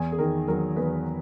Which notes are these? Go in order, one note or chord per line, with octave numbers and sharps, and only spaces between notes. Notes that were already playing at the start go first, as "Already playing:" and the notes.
Already playing: E2 G#5
G#4
D#3 A#4
F#3 A#4
E2 B4